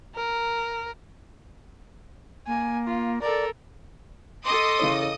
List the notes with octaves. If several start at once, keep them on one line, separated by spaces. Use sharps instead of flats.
A#4
A#3 G#5
F4
A4 A#4 D5
A4 D#5 C6 D6 D#6
C#3 E3 C#4